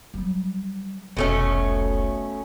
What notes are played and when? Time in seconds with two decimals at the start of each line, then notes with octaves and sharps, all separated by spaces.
0.14 F#3 G3
1.17 F1 C2 B2 A3 C#4